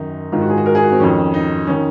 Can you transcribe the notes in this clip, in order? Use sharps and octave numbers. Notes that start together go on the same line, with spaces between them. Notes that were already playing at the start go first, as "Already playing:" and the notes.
Already playing: F#2 D#3 D#4
G#2 D#3 F4
F#4
G#4
F#4
A#4
G#4
F#4
C4
F2 D#3 C#4
D#4
D#3 C#4